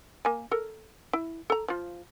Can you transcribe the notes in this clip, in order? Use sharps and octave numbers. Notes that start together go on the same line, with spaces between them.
A#3 G#5
A4 A#4
E4
A4 A#5
F3 F4